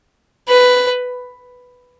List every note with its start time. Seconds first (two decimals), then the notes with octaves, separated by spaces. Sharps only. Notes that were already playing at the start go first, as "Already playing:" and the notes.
0.48 B4